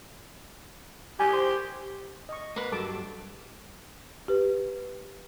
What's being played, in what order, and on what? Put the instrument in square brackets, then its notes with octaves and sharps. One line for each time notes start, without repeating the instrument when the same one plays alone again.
[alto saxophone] G4 [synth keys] G#5
[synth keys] C5
[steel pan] D#5 C#6
[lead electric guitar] A#3 B4
[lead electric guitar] G2 F#3 [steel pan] A4 A5 D6
[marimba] G4 B4